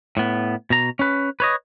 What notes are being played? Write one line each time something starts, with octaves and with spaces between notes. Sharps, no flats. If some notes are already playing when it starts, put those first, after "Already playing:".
A2 B3
B2 A#5
C#4 B4
B4 C#5 D#5